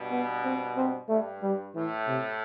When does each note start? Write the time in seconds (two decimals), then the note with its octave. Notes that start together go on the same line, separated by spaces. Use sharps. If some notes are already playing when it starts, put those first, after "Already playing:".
Already playing: G2 B2
0.11 B3
0.44 C4
0.77 C4
1.09 G2 A3
1.42 G3
1.75 A2 E3
2.07 C3